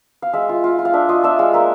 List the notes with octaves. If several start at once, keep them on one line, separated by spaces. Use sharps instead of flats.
F5
G#3 E5
F4
F4
F4
F5
D4 E5
F4 D#5
D4 E5
G#3 F5
A#3 E5